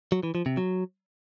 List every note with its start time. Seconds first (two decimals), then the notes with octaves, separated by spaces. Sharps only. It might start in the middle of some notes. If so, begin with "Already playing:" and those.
0.12 F#3
0.23 E3
0.35 F3
0.46 C3
0.57 F#3